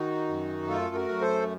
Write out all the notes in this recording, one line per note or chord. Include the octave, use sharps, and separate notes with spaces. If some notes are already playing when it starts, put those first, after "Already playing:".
Already playing: D#3 D#4 F#4
F#2
A3 F4 A4
F#4 A#4
F#2
A4 C5